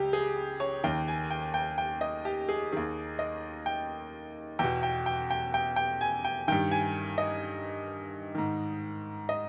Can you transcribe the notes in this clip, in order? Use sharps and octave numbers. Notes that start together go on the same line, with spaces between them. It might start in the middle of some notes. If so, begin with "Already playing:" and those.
Already playing: C#2 C#3 G4
G#4
C#5
D#2 D#3 G5
G#5
G5
G5
G5
D#5
G4
G#4
D#2 D#3 G#4
D#5
G5
E2 B2 G5
G5
G5
G5
G5
G5
G#5
G5
G2 D#3 G5
G#5
D#5
G#2 D#3
D#5